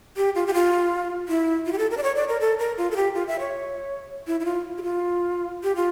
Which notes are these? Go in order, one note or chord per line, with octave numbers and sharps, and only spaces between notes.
G4
F4
G4
F4
E4
F4
G4
A4
A#4
D5
C#5
D5
A#4
A4
A#4
F4
A4
G4
F4
E5
C#5
E4
E4
F4
G4
F4
G4
F4